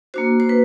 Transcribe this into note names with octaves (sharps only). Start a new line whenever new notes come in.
A#3 D4 F#4 C5
C5
B4